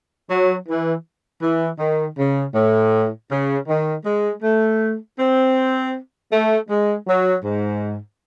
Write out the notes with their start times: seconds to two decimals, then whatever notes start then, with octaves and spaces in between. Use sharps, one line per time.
0.29 F#3
0.68 E3
1.43 E3
1.79 D#3
2.18 C#3
2.55 A2
3.31 C#3
3.68 D#3
4.05 G#3
4.43 A3
5.19 C4
6.32 A3
6.68 G#3
7.07 F#3
7.44 G#2